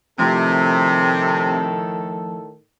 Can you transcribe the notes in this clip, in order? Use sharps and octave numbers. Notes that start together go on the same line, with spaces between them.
A2 C3 D#3 F3 A3 A4 B5